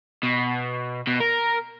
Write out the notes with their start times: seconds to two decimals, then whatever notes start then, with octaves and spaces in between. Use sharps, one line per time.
0.23 B2
1.07 B2
1.20 A#4